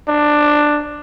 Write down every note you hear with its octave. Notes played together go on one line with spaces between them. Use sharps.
D4